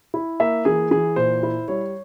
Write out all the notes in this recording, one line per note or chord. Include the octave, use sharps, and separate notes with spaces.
E4
A#3 E5
E3 G#4
E3 G#4
A#2 C5
E4
G3 C#5